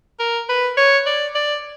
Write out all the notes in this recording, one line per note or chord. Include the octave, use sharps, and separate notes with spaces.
A#4
B4
C#5
D5
D5